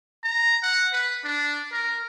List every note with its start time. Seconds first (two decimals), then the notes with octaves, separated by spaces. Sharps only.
0.24 A#5
0.63 F#5
0.93 B4
1.24 D4
1.72 A#4